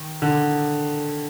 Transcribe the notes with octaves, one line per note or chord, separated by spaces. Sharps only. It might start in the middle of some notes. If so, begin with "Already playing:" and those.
Already playing: D#3
D3